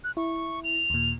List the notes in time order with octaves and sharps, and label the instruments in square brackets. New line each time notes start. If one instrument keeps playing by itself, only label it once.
[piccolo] F#6
[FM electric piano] E4 [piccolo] C#6
[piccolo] F7
[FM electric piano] D#2 A#2